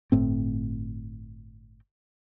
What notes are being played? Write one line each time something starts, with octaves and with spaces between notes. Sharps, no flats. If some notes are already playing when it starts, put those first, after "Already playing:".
G1 A2 C4